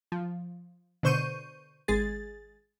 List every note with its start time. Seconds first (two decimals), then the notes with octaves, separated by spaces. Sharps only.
0.12 F3
1.03 B2 D3 C5 C#6 G6 D#7
1.88 G#1 G#3 G#4 A6